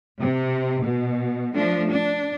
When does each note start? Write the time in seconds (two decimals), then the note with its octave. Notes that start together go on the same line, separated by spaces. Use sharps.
0.22 C3
0.82 B2
1.56 F3 A3 D4
1.88 D4